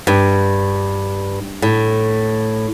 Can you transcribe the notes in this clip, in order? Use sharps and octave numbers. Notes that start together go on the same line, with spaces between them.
G2
A2